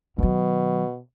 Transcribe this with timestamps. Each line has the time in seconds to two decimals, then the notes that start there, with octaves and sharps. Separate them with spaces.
0.18 B2 D#3 F#3